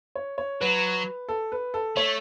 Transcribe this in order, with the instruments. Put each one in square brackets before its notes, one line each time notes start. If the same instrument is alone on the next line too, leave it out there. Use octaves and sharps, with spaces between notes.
[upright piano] C#5
C#5
[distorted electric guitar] F#3 [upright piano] B4
[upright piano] A4
B4
A4
[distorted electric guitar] A3 [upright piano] C#5